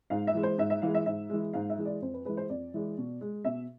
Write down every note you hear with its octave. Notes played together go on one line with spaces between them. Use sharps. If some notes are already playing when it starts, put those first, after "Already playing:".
G#2 F5
E5
E3 G#3
C5
G#2 E5
E5
E3 G#3 F5
E5
G#2 E5
E3 G#3
G#2 F5
E5
E3 G#3
D5
F2 C5
B4
E3 G#3 B4
C5
F2 D5
E3 G#3
B2
G#3
B2 E5